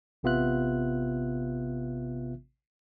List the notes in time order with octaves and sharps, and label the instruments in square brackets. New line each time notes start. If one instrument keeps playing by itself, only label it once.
[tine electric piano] A1 C3 B3 F4 E5 F#6